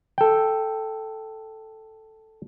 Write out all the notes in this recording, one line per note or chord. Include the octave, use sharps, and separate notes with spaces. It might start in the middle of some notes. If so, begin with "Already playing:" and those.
A4 G5